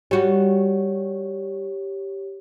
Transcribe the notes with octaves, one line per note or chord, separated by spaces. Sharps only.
G3 F#4 G4 C#5